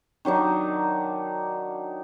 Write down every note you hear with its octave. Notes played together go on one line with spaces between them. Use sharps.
D#3 F#3 D4 D#4